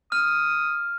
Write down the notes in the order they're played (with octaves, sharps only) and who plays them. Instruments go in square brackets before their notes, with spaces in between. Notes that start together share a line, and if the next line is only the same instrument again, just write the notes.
[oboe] D#6 [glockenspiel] F6